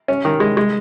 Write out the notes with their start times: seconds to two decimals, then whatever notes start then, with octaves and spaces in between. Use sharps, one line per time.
0.08 C#4
0.25 D#3
0.40 G#3
0.57 G#3